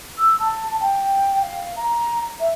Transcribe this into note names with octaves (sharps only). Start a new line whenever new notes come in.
E6
A5
G5
F5
A#5
E5